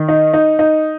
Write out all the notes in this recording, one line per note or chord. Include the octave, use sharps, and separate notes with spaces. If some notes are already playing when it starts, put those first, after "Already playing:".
Already playing: D#3
D#4
D#4
D#4